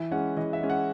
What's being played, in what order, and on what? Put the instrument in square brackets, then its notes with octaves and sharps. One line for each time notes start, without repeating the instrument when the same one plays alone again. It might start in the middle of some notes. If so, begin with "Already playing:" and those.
Already playing: [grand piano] E3 E5
G#3 C#4 F#5
E3 D#5
E5
G#3 C#4
F#5